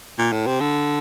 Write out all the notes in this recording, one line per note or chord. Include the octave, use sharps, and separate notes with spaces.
A#2
A2
C3
D3